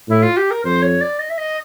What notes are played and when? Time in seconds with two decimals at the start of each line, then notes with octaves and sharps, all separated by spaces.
0.08 A2 E4
0.23 F4
0.37 G4
0.51 A#4
0.64 F2 C5
0.82 C#5
1.01 D5
1.19 D#5
1.30 E5
1.38 D#5